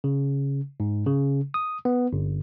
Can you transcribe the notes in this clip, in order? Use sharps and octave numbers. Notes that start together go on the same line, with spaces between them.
C#3
G#2
C#3
D#6
B3
G1